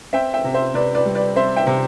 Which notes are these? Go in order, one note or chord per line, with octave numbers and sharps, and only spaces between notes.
C4 E5 G5
E5 G5
C3
C5 E5
C3 B4 D5
B4 D5
G3
B4 D5
C4 C5 E5
E5 G5
C3